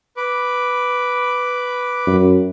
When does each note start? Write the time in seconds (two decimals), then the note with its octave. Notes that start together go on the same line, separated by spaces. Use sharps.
0.17 B4 D6
2.07 F#2